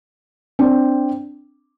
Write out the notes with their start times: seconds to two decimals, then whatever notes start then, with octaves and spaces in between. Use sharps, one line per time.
0.59 C4 D4